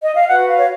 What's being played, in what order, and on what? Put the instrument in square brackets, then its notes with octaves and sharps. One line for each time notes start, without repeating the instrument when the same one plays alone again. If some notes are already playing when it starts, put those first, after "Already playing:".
[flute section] D#5
F5
F#4 B4 F#5
F5
C#5